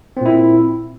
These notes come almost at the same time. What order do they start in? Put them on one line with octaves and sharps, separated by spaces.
C4 A#2 E4